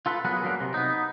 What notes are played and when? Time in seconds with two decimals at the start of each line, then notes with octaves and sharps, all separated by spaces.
0.06 F4 A4 B4
0.25 F#3 B3 G#4 A#4 B4 F#5
0.43 D3 F#3 A#3
0.60 C3
0.74 B3 D#4